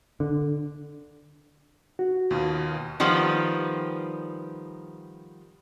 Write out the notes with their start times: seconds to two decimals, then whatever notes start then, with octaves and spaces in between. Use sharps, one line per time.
0.20 D3
1.99 F#4
2.31 D#2 B2 F4
3.00 D#3 F3 G3 B3